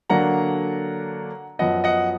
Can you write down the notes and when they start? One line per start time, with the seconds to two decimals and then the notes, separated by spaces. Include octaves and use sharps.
0.10 D3 F#3 A#3 D4 F#5 A#5
1.59 F#2 F3 B3 D#5 F#5
1.84 D#5 F#5